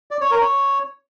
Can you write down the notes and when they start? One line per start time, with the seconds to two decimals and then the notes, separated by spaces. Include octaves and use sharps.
0.11 D5
0.21 C#5
0.31 A#4
0.41 C#5